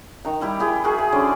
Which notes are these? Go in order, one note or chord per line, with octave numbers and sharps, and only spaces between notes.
D#3 A#5
G3 E4 G4
E4 G#4 G5
F#4 G#4 A#4
G#5
D3 C#4 C5 D5